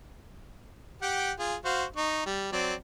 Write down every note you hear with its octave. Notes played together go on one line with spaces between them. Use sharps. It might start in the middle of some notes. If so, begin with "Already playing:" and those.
G4 F#5 G5
F4 G#4
F#4 C5 F5
D#4 C#6
G3
F#3 C4 D5